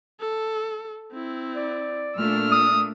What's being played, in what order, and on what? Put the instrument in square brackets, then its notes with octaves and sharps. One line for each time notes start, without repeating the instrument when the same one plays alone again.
[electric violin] A4
C4 E4
[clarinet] D5
[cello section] A#2 A3 D4 [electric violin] E6 F6
[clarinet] D#6